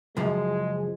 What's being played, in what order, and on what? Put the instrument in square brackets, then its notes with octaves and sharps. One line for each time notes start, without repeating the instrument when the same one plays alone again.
[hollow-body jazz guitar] C#2 F#2 F3 [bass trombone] G#3